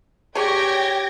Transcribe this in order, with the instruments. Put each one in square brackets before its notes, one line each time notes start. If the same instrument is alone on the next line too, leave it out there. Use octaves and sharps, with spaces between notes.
[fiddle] G4 [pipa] G#4 C#5 D5 [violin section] G5 G#6 A#6